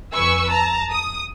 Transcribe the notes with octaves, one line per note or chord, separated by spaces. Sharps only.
F2 B4 G#5 C#6 E6
A5 A#5
D#6